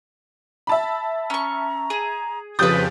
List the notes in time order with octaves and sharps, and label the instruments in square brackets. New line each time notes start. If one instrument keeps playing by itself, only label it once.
[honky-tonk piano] E5 A5 B5
[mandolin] C#4 C#6 [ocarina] A#5
[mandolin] G#4
[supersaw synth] F2 C#3 F3 [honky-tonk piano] G4 G6 A6 [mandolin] B4 D#6